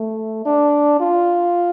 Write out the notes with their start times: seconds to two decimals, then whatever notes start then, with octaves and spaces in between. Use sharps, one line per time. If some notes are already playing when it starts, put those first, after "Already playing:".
Already playing: A3
0.45 D4
1.00 F4